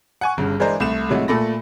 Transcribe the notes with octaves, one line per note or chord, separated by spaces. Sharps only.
F#5 G#5 C#6
G1 G2 C#3
E3 G#3 D4 A#4 C5
C2 A3 E7
G#2 C3 F#3 G#3 A3 E4
A#2 A3 A4 B5 A#6